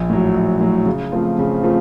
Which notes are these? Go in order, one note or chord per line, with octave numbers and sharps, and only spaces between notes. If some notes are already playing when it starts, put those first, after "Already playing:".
Already playing: A#1
A2 F#3
A#1
A2 F#3
C#3
F3 A3 C4 F4
C#3
F3 A3 C4 F4